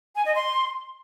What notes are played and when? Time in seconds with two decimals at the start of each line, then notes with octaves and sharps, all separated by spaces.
0.16 G#5
0.25 D#5
0.35 C6